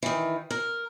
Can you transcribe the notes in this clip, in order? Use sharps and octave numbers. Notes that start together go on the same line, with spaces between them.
D#3 E3
A#4